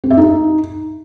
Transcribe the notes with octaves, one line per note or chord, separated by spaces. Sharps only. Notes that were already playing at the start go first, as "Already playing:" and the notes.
C4
E5
D#4